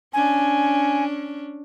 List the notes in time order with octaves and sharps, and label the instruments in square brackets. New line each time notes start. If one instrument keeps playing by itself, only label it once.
[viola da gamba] C#4 D4 [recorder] G#5